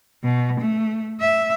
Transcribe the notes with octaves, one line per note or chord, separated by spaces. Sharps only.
B2
A3
E5